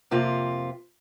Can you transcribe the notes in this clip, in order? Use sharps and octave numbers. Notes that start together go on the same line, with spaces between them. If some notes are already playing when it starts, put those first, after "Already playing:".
F2 C3 A#3 F4